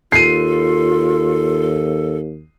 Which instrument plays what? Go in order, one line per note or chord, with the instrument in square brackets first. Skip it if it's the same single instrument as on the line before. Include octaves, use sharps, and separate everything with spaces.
[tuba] D#2 [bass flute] F4 [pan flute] A4 [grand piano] C7 D#7